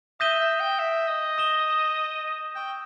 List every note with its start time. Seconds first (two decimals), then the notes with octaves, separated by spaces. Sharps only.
0.20 E5 D#6 G6 A#6 D#7 G7
0.40 E5
0.60 G5
0.79 E5
1.08 D#5
1.38 D#6 A#6 E7 G7
2.55 G5 C#6 E6 G6